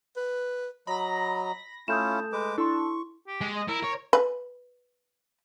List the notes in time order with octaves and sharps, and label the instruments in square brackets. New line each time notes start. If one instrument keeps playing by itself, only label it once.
[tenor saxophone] B4
[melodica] F#3 D#5 A#5 [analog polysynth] B5 A#6
[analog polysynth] A3 A4 [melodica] C#4 E4 F4 [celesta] D#6 G6 E7
[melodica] G#3 B4 D6
[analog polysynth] D4 A4 [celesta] E4 C6 [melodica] C#6
[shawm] G4
[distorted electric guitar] G#3
[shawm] D#5
[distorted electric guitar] E4 [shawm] A#4
[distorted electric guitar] C#5
[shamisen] B4